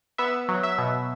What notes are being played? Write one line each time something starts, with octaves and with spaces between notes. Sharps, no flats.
B3 E5
F#3
E5
B2